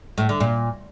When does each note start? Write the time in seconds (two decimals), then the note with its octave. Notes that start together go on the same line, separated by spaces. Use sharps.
0.18 A2
0.29 D3
0.40 A#2